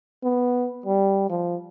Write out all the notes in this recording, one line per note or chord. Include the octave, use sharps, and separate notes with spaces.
B3
G3
F3